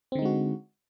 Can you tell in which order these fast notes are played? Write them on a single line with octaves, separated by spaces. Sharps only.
C4 D3 D#4 G#3 F#4